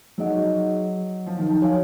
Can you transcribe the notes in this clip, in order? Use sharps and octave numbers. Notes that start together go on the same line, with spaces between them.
F#3 D#4 G#4 D#5 F#5
F3
D#3
F3
F#4 C#5 F5 G#5